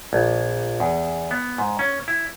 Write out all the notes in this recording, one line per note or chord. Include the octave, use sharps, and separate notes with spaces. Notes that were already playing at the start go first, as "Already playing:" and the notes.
A#1
E2
B3
G#2
C#4
E4